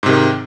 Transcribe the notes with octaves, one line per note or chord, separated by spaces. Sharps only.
G#2 C3 D#3